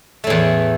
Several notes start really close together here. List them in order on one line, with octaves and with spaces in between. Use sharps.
A3 A2 E2